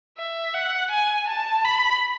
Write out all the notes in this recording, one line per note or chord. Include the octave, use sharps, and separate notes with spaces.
E5
F#5
G#5
A5
B5